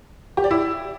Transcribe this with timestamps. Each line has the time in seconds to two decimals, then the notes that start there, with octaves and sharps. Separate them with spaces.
0.37 G4
0.44 D5
0.51 E4